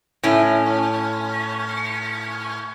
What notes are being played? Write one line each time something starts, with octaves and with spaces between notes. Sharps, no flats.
A2 C#4